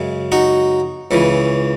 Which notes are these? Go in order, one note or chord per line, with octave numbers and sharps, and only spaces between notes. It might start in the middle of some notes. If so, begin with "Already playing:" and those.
Already playing: F#2 C#3 G#3
D#4 F#4
C#2 C#3 E3